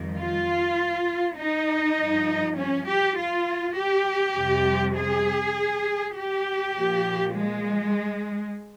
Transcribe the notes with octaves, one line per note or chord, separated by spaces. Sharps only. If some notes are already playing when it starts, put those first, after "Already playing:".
Already playing: F2 D#3 G3
F4
D#4
G2 F3
C#4
G4
F4
G4
F2 C3 G3
G#4
G4
A#2 F3
G#3